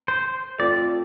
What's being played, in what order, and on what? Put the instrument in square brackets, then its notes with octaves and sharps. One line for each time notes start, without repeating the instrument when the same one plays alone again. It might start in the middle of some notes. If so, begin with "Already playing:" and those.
[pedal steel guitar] C5
[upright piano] A3 C4 F4 [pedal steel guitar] D5